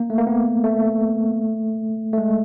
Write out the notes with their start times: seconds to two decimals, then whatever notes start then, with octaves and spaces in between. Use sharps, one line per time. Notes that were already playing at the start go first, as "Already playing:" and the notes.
Already playing: A#3
0.10 A3
0.18 A#3
0.27 B3
0.64 A3
2.13 A3
2.18 G#3